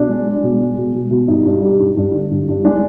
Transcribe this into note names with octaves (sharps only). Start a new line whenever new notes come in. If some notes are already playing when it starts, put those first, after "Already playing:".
Already playing: B2 D4
G#3
G#3
B2
G#3
B2
B2
B2
G2 D#4
G2
G3
G2
G2
D3
G2
G2
G#3 D4